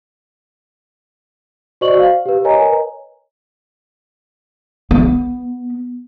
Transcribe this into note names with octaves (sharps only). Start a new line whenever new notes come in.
F#4 C5 D5 D#5 C#6 F#7
F5
G4 B4
A#4 B4 C#5 D#5 G#5 A#5
B3